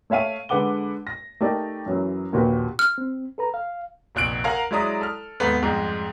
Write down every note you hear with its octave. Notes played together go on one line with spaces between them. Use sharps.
A3 C#5 E5 F5 D#7
D3 G#3 B4 F#5 D6 G7
A#6
A3 D#4 G4 A#4 D5
F#2 E3 F#3
A#1 D#2 A#2 F#4 G4 B4
F6
C4
A4 B4 A#5
F5
F1 A#1 F#6 D7
A#4 F5 F#5 G#5 A#5
F#3 G#3 E4 D5 A#5 D#6
A4 F6
D#2 G#2 A3 B3
F2 G#2 G3 G#3